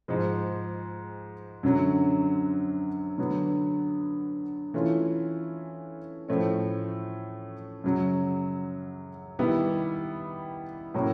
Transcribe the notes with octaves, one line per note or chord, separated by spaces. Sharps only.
G#2 F3 G#3
F#2 D3 F#3
D3 F#3 B3
E3 A3 C#4 F4
A2 F3 A3 C#4
F#2 C#3 F#3
D#3 G3 B3 E4 G4
A2 F#3 A#3 C#4 F#4